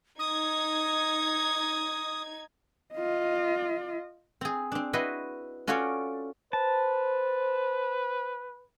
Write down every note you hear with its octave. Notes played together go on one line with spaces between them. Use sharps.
D#4 D#6 G#6
F4 D#5
C4 G#4
C4 D4
E4 F#4 B4 D#5 C6
C#4 F4 F#4 A4 C#5 D5
B4 C5 A5